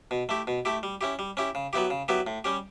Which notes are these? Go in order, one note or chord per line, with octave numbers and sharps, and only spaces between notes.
B2
A3 E4 G4
B2
A3 E4 G4
G3
C#4 E4 G4
G3
C#4 E4 G4
C#3
F#3 B3 E4 G4
C#3
F#3 B3 E4 G4
A2
G3 C#4 G4